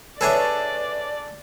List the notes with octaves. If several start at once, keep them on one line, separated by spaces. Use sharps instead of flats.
D4 G#4 A4 B4 C#5 D5 E5